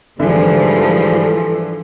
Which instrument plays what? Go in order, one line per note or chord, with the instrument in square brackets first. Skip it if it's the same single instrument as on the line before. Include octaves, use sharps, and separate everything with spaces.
[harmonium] G#2 G3 G#4 [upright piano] D3 [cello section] E3 F3 [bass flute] A4